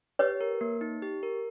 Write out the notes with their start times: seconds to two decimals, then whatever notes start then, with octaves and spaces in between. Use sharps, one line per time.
0.19 G4 B4 C#5
0.41 A#4
0.61 A#3
0.81 D#4
1.02 G4
1.23 A#4